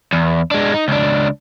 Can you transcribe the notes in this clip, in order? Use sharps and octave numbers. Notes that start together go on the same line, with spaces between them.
E2
G#3 D4
D#4
C#2 D4